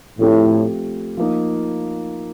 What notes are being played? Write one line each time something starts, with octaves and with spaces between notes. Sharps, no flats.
A2 F3 A3 C4 G4
F3 A#3 D#4